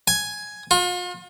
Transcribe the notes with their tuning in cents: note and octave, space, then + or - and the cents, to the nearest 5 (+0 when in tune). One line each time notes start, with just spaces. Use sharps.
G#5 +5
F4 +40